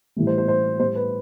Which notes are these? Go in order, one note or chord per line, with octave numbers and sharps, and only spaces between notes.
A2 E3 G3
C5
C5
C5
A2 G3 C5
B4